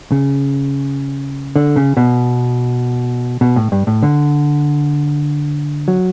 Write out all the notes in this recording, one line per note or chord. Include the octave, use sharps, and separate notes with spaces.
C#3
D3
C#3
B2
B2
A2
G2
A2
D3
F#3